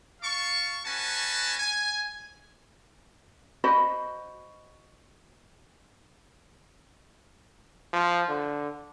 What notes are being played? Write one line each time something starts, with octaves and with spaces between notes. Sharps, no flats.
F5 A5 C#6
C#4 F#4 B4 G#5 A5
G#5
F#4 C5 D#5 B5
F3
D3